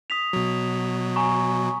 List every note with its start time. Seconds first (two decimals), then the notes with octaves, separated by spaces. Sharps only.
0.10 D#6 B6 F7
0.33 B2 F#3
1.16 G#5 A#5 C#6